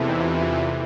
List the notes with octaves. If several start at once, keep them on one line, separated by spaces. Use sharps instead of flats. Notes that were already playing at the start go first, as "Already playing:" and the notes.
Already playing: E2 C3 E3 A3
D#4
E4 F4
F4
E4